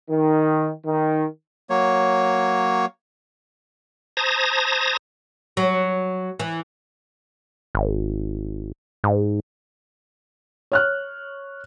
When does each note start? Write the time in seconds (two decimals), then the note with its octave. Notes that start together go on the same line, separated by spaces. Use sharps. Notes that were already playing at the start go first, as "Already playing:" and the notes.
0.10 D#3
0.86 D#3
1.70 F#3 A#3 C#5
4.17 C5 A5 A#5 D#6 G#6 A#6
5.57 F#3
6.40 E3
7.75 G#1
9.04 G#2
10.72 C#5 F6 F#6